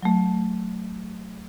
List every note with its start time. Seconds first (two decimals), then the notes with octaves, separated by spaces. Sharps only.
0.03 F#3 A3